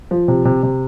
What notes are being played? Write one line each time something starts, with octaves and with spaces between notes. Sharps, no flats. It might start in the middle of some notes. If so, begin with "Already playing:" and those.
F3
C3
C3
C3